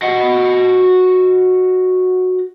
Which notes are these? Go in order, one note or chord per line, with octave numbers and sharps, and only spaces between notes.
F#4 D#5 F#5